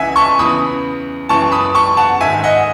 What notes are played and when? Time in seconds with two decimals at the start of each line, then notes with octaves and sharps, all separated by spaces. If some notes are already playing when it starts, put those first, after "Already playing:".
Already playing: C#2 C#3 E3 E5 F#5 G#5
0.16 A5 C#6
0.38 E2 C#3 E3 B5 D#6
1.29 F#2 C#3 E3 A5 C#6
1.52 B5 D#6
1.74 A5 C#6
1.97 F#5 A5
2.20 G#2 D#3 E5 G#5
2.44 D#5 F#5